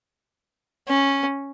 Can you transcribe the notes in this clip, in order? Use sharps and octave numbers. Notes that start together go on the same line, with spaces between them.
C#4